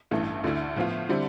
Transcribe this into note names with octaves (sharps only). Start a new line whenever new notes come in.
A1 G2 E3 A3
D2 D3 A3 E4
A2 F3 B3 F4
D3 G3 C4 E4